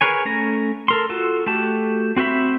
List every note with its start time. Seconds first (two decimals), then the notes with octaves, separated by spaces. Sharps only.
0.01 G#4 A#4 B4 C#5 G#5
0.25 A3 C#4 A#5
0.88 A4 A#4 C6
1.09 F4 F#4 A4
1.46 A3 F#4 G4 A5
2.16 C4 F#4 C5 E5 B5